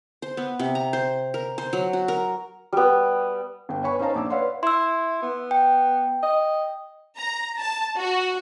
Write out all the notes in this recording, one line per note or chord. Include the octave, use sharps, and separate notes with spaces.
C5
B3
C3
A#5
C5
A#4
C5
F#3
F#4
A#4
G3 B3
G1 G5
B4 C#5 G#5 B5 C#6
C#4 D#4 C5 F5 A5 A#5
A#1 D6 E6
B4 C#5 D5 F5 F#5 C6
E4 C6 E6
B3
G5
D#5
A#5
A5
F#4